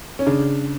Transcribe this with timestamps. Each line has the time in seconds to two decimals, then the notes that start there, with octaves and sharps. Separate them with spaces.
0.19 C#4
0.27 C#3 D4